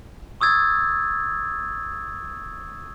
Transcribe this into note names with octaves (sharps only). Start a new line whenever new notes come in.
C#6 D#6 E6 G#6 A6